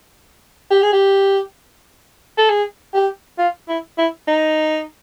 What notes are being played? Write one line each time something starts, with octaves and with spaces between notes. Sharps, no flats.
G4
G#4
G4
A4
G#4
G4
F4
E4
E4
D#4